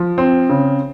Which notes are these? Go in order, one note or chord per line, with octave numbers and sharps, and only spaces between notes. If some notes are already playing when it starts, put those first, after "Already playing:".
Already playing: F3
C4
C#3